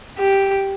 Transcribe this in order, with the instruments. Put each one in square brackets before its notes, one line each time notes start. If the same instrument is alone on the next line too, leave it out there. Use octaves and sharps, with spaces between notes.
[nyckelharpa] G4